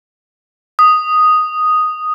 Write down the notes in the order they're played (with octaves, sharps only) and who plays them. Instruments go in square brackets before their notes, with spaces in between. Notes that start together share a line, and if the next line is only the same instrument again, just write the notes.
[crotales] D#6